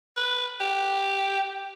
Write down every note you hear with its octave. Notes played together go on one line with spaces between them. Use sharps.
B4
G4